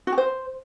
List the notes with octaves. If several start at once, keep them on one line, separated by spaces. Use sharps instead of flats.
F#4
G4
C5